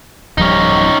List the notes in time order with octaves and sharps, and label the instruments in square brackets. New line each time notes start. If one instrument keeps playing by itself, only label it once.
[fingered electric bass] D1 F3 G3 [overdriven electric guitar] C#4 D#4